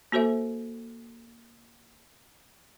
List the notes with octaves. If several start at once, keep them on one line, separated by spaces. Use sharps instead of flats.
A#3 F#4 A4 C5 E5